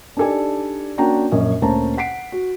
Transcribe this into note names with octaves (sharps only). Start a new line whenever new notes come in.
D4 D#4 G4 A4 D5 G#5
A#3 C#4 D4 F#4 G5 A#5
A#1 F#2 C#4 D#5
D2 A#2 C#4 C5 A5 A#5
F#5 B6 C7 D7
F#4